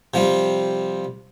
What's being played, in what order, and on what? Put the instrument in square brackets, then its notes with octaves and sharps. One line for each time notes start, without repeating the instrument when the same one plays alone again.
[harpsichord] C3 F3 G3